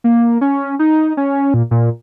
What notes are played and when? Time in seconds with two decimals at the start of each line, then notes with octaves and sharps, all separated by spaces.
0.04 A#3
0.41 C#4
0.79 D#4
1.17 C#4
1.54 A#2
1.71 A#2